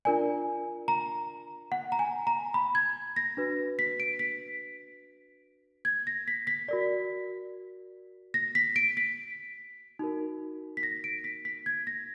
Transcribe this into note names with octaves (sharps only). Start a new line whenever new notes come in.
D4 F4 A#4 D5 G#5
A#5
F#5
A#5
G#5
A#5
B5
G#6
A#6
D4 F#4 B4
B6
D7
B6
G#6
A#6
B6
B6
F#4 A#4 D5
A#6
B6
D7
B6
D#4 F#4 A#4
B6
A#6
D7
B6
B6
G#6
A#6